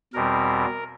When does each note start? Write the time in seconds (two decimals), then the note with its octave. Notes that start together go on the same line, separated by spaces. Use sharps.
0.13 E2 B2 G3 C4 A#4